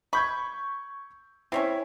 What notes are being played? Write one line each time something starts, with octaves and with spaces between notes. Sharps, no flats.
B5 C#6 G6 G#6
C4 C#4 E4 C#5 C#6